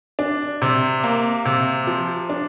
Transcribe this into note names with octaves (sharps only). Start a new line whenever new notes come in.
D4
C3
A#3
C3
F3
D4